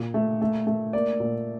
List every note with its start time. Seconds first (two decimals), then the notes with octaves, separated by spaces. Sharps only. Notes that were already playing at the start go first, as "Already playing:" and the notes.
Already playing: A#2
0.14 A3
0.42 A3
0.67 A3
0.93 A#3 D5
1.20 A#2